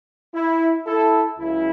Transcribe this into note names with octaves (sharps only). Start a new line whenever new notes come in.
E4
E4 A4
C#2 C#3 F#3 E4